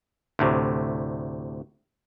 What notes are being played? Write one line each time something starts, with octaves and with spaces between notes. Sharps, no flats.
D2 A2 C3